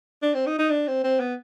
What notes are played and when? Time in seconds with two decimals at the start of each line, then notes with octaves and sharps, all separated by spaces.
0.22 D4
0.34 C4
0.46 D#4
0.59 D#4
0.70 D4
0.87 C4
1.04 C4
1.20 B3